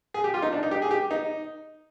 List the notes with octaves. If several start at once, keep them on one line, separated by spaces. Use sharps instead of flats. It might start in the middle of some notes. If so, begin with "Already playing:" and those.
G#4
G4
F4
D#4
D4
D#4
G4
G#4
G4
D#4